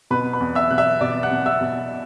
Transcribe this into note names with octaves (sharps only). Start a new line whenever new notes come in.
B2 B4 B5
B4 B5
E2
E5 E6
B2 F#6
E5 E6
B2 D5 D6
F#5 F#6
B2
E5 E6
B2